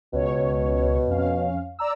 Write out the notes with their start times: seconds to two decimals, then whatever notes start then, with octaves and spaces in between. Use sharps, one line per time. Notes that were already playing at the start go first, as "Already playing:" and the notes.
0.13 C#2 B2 C#5
1.08 F2 C#4 F5
1.79 D5 A#5 E6